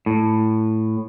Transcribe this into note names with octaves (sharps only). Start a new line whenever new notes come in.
A2